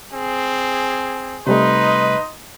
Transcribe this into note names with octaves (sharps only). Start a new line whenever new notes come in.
C4 G#4
C3 G3 A3 D#4 B4 D#5 C6